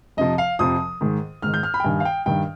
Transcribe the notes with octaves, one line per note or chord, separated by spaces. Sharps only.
F2 C3 F3 D#5
F5
F2 C3 F3 D#6
G#2 D#3
G#2 D#3 F6
G6
F6
B5
G5
G2 D#3 G#5
F5
G5
G2 D#3 G5